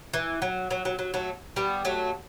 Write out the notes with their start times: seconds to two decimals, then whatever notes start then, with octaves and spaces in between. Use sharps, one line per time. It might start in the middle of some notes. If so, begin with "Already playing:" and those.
0.13 E3
0.42 F#3
0.71 F#3
0.85 F#3
0.99 F#3
1.14 F#3 A3
1.56 G3 B3
1.85 F#3 A3